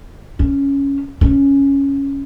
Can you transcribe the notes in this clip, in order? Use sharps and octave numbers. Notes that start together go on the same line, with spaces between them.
C#4
C#4